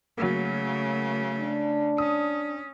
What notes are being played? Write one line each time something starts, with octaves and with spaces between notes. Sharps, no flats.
C#3 F#3 A3 A#3
D4
C#4 D#6